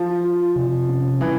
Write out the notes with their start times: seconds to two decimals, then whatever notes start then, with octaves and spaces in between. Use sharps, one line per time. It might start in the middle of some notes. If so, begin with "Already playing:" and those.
Already playing: F3
0.24 F4
0.56 C3
0.89 C#4
1.21 E3 G3